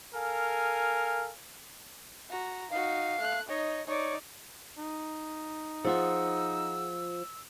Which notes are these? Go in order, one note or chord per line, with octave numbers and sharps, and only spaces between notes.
A4 A#4 F5 G#5
F#4 A#5
D#4 F#4 F5
A3 F#6
D#4 C#5 D#5
D#4 C#5 D5
D#4
F3 F4 G#4 F#5 E6